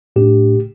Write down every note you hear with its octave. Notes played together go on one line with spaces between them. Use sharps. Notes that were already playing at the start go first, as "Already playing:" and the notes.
A2 A3 D4 G4